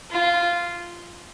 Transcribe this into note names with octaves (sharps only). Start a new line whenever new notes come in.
F4